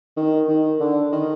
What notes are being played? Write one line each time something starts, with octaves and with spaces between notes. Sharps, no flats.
D#3
D#3
D3
D#3